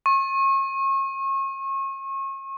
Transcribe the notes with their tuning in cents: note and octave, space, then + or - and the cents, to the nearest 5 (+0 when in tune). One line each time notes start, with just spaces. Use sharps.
C#6 -35